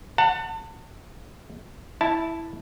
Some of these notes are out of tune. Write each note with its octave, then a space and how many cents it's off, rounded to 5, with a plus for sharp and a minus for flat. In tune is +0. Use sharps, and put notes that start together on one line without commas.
F#5 +0 A5 +35
E4 -5 A5 +0